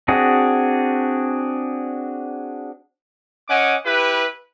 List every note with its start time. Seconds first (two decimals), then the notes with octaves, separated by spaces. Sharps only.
0.08 C4 D4 F#4 G#4
3.48 C#4 D#5 F#5 G#5 D6
3.85 E4 G4 B4